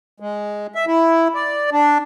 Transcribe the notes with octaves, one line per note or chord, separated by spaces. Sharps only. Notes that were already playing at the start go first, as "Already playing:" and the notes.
G#3
E5
E4
D5
D4